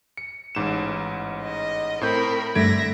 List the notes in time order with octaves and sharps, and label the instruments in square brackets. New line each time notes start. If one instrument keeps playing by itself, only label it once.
[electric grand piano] C#7
A1 G#2 E7
[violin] D#5
[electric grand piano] A2 C4 G6 [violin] A#4 B5
[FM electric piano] G2 A3 [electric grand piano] D3 G#6 D7 [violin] E5 A#6